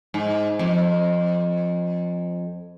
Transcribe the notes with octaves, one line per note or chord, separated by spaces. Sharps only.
G#2
F2